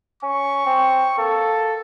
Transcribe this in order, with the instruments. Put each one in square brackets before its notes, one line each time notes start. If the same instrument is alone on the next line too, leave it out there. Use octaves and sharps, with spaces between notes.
[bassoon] C#4 [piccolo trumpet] C#6
[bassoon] C4
[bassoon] A#3 [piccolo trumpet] A4